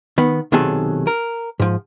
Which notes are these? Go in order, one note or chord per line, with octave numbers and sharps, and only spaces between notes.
D#3 B3
B1 C3 D#3 F#3 G#4 A4
A#4
G#2 F3